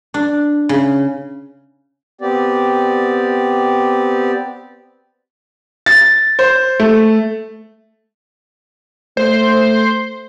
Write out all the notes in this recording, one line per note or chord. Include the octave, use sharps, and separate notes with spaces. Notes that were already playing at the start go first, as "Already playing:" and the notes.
D4
C#3
B3 C4 G4 D5
A6
C5
A3
A3 C5